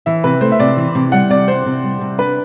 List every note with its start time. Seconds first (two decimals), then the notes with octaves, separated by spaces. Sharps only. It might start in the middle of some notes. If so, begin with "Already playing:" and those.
0.06 E3 E5
0.24 C3 B4
0.41 A3 C5
0.52 E5
0.59 C3 D5
0.77 E3
0.95 C3
1.12 G3 F#5
1.30 C3 D5
1.47 C4 C5
1.66 C3
1.84 G3
2.01 C3
2.18 D4 B4